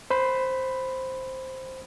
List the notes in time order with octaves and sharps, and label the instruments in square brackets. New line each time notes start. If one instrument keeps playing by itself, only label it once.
[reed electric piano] C5 B5